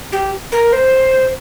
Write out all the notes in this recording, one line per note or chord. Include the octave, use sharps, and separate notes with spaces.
G4
A#4
C5